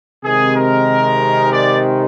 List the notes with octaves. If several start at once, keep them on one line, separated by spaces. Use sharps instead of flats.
C3 D#3 G#3 G#4
A#4
D5